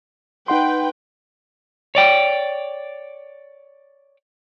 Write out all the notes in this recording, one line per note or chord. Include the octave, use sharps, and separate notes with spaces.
D#4 B4 F#5 G5 C6
C#5 D5 G5